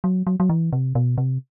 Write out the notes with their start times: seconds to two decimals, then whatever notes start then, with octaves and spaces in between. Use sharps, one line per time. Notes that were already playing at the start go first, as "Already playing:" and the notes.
0.04 F#3
0.27 F#3
0.40 F#3
0.50 E3
0.73 C3
0.95 B2
1.18 C3